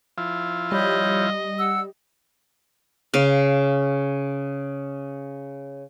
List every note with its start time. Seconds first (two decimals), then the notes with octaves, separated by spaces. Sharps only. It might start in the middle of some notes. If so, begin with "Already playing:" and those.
0.18 F3 E4 F4
0.72 G3 C#5 D#5 B5 G6
1.59 F#5 E6
3.14 C#3 F5